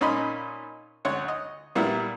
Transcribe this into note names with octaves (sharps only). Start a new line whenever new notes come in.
A#2 C#4 D#4 D#5 B5 C6
D2 C#5 F#5 C6
D#5
A#2 G3 B3 E4